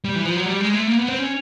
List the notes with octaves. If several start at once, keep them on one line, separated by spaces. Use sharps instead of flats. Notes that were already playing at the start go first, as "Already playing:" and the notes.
G3
E3
F3
F#3
G3
G#3
A3
A#3
B3
C4
C#4